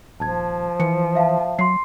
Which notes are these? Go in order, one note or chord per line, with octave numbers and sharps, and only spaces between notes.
D#1 F3 A5 G#6
E3 C#7
E5 F5 A5
F#3 C6 C7